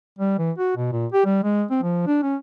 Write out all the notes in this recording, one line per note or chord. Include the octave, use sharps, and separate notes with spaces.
G3
E3
F#4
B2
A#2
G4
G3
G#3
C4
F3
D4
C#4